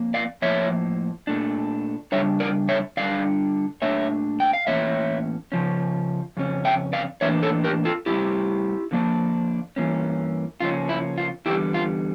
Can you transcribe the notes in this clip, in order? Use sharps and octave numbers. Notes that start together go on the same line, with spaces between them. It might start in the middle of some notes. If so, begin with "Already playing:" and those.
Already playing: F2 A#3
D5 F5
A2 F3 A#3 C#5 E5
A#2 A3 D4
C#3 G3 D4 C#5 E5
A#4 D5
C#5 E5
D3 G3 D4 D5 F5
A#2 A3 D4 C#5 E5
G5
F5
A2 E3 A#3 C#4 C#5 E5
C#3 F3 C#4
F2 C#3 C#4
E5 G5
D5 F5
A2 E3 A#3 D4 C#5 E5
A4 C#5
G4 A#4
F4 A4
A2 E3 G3 E4 G4
D3 F3 A#3 D4
G2 E3 A#3 C#4
C#3 F3 A#3 C#4 F4
E4
F4
E2 D3 G3 E4 G4
F4